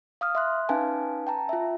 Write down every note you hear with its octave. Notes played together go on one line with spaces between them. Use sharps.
F5 D#6 F6
E5 C6 F#6
C#4 D#4 B4 F5 G#5 A5
G5 A5 A#5
F4 E5